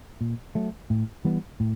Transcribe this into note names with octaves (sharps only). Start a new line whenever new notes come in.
A#2
F#3 A3
A2
E3 G3 B3
A2